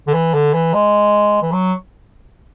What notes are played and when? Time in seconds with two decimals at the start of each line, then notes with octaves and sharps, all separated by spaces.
0.08 D3
0.14 E3
0.34 D3
0.54 E3
0.74 G#3
1.42 E3
1.53 F#3